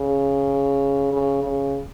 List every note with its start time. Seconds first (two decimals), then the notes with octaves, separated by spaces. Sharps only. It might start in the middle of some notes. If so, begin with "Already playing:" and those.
Already playing: C#3
1.13 C#3
1.43 C#3